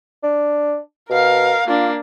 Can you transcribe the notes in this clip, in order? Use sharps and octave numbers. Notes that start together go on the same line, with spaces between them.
D4
B2 A#4 F5
A#3 D4 F4